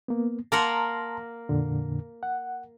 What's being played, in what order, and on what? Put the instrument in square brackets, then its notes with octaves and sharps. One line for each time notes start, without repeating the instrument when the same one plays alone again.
[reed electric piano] A#3 B3
[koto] A#3 A#4 F#5 [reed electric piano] A5 A#5 C6
[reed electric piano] F2 A#2 D3
F#5